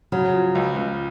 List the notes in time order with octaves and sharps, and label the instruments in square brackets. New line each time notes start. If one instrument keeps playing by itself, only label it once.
[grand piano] C#3 [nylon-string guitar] F#3
[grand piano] F3
C#2
C#2